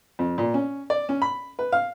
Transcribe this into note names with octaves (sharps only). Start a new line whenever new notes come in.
F2
A#2
C#4
D5
C#4
B5
B4
F5